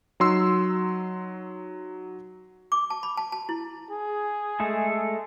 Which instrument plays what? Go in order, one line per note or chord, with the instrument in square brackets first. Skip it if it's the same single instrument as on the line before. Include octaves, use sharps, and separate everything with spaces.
[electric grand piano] F#3 D#4 C6 E6
[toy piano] D6
A5
B5
A5
A5
E4
[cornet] G#4
[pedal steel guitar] G#3 A3 A4